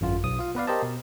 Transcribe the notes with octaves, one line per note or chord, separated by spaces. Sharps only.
G#1 F#2 F4
B1 D#6
F4 F5
B3 B4 D5 F5
G4 A#4 C5 D#5 A5
B2